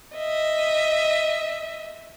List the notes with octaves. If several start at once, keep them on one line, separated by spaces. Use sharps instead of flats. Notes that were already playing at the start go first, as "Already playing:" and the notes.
D#5 E5